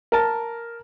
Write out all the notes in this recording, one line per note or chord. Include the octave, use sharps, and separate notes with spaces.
A#4 A5